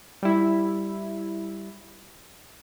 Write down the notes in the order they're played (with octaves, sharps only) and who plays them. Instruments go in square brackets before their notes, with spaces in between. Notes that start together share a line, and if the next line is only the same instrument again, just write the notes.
[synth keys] G3 E4